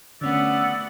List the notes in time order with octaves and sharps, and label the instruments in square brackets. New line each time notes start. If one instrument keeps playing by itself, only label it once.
[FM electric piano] D3 C#4 [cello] A3 B3 [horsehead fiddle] D5 F#5 [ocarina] E6